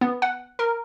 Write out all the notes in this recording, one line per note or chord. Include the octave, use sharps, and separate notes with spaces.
B3
F#5
A#4